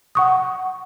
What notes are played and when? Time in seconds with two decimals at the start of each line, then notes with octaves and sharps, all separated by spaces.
0.15 F#5 C#6 D#6